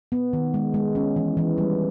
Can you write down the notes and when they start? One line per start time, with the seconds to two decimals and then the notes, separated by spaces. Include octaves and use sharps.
0.12 B3
0.33 D#3
0.54 G#3
0.74 G#3
0.95 C#4
1.16 E3
1.37 E3
1.58 G3